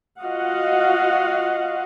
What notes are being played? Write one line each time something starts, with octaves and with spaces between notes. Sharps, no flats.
F4 F#4 D#5 F5 F#5